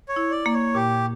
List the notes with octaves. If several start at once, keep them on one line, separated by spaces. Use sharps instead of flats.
C#5
E4
D5
A#3
C#5
A#2 G4